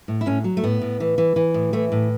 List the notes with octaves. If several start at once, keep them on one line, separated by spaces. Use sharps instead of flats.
A2
E4
A2 C#4
F#3
A3
A2 B3
A2
E3
E3
E3
A2
E3 A3
A2